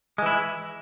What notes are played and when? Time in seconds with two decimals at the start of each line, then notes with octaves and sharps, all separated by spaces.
0.18 G#3
0.22 E3
0.26 E4